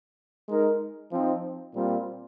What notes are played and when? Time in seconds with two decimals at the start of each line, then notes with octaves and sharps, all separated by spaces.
0.48 G#3 D#4 A#4
1.12 F3 C4 D#4
1.74 A#2 G3 C4 F4